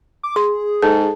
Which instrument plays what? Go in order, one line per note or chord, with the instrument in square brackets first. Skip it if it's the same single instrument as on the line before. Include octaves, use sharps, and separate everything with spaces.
[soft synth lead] D6
[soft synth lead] G#4 [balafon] C6
[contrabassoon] G#2 [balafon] A4 [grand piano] A5